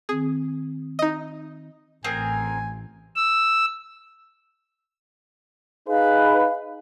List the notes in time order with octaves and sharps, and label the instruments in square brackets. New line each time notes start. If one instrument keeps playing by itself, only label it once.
[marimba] D#3 C4 [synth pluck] G#4
[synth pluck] D#4 D#5
[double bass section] A1 [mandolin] C4 G#4 A#4 [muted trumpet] G#5
[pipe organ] E6
[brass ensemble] D#4 G#4 B4 [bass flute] F5